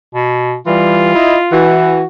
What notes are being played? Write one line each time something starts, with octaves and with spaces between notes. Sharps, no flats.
B2
E3 G3 F4
E4 D#5
E3 F#4